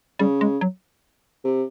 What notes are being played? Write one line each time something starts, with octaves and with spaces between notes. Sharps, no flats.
C#3 G3
G#3
F#3
C3